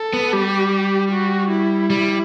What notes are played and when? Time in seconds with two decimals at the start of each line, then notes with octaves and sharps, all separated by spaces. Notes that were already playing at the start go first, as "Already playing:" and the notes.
Already playing: A4
0.13 B3
0.33 G3 G4
1.11 F#4
1.51 E4
1.90 G3